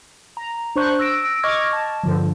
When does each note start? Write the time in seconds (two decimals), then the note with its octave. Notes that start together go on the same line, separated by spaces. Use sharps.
0.37 A#5
0.76 D4 C5 C#6 F#6
0.99 E6 A#6 D7
1.43 D#5 C#6 D6 F6 G#6 A#6
1.73 A5
2.03 G2 D3 F3